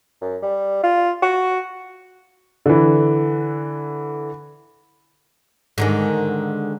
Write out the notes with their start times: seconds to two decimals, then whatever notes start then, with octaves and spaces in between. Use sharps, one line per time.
0.21 F#2
0.42 G3
0.83 F4
1.22 F#4
2.66 D3 E3
5.78 G#2 D3 D#3